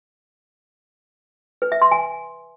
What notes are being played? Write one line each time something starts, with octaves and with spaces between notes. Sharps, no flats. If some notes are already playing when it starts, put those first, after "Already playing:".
B4
E5
C6
G#5